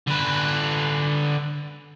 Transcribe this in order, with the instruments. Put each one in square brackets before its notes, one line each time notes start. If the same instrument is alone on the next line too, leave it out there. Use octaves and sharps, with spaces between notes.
[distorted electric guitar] D3 B4